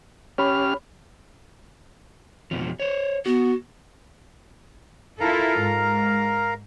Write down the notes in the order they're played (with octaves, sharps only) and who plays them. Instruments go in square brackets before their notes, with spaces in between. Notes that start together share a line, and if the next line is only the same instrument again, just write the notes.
[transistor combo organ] C#4 G4 F6 [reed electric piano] C#5 B5
[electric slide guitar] F2 B2 F3
C5 C#5
[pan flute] B3 [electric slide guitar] F#4
[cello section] E4 F4 A4 [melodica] A#4 F5 A#5
[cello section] G#2